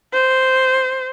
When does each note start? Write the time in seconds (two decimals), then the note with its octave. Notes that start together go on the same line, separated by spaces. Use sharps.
0.13 C5